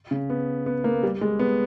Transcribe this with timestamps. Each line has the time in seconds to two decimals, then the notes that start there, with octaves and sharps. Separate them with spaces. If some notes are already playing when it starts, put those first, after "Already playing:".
0.11 C#3
0.30 B3
0.66 B3
0.84 A#3
1.03 G3
1.21 G#3
1.39 B3